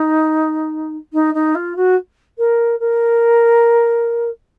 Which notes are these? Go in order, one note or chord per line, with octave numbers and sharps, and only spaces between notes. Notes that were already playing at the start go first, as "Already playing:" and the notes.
Already playing: D#4
D#4
D#4
F4
F#4
A#4
A#4